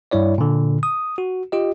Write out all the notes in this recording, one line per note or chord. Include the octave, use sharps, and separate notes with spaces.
G2 G3 E4 C#5 D5
A#2 D3
D#6
F#4
F4 G4 D#5